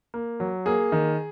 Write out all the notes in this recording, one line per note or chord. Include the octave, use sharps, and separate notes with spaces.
A#3
F#3
A#3 G#4
D#3